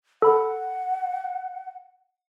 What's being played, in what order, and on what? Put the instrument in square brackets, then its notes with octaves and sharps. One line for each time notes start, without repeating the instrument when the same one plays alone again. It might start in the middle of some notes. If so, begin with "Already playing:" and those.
[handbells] A4 B5 [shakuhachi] F#5